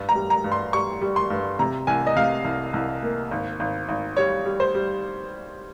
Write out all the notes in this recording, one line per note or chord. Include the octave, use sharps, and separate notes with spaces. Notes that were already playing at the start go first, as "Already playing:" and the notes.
Already playing: G2
A#5
G3
A#5
G2
C6
G3 C#6
G3
C6
G2
C3 A#5
C2 G#5
D#5
C3 F5
C2
C2
A#3
G#1
G#1
G#1
G3 C#5
G3
C5
G3